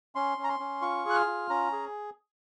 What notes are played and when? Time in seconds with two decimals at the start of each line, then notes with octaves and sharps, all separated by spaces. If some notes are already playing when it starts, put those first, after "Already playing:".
0.15 C#4 C6
0.38 C#4
0.44 A#5
0.49 C6
0.59 C#4
0.82 F4 C#6
1.05 G#4 F#6
1.15 F6
1.26 F4
1.50 C#4 A#5
1.72 G#4